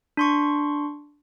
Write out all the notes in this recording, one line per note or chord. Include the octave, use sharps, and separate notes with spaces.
D4 C6 C#6